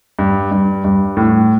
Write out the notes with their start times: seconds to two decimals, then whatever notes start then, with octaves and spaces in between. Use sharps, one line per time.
0.19 G2
0.51 G2
0.84 G2
1.17 A2